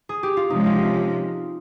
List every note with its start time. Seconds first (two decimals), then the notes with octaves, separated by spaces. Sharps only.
0.09 G#4
0.23 G4
0.37 F4
0.49 C3 F3 G#3 C#4 D#4
0.66 F4